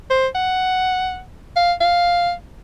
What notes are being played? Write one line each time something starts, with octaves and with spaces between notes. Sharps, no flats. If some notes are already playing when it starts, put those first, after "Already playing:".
C5
F#5
F5
F5